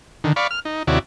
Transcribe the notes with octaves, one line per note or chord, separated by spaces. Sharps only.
D3 D#3
D5 F5 B5 C#6
F6
D#4
D#2 C3 E4 F#4 C#5 D5